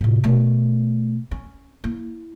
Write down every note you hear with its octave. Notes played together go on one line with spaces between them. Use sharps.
A2 C3
B2 A3
C#4
A#3 E4